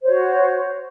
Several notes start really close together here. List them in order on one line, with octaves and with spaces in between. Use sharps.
C5 C#5 F#4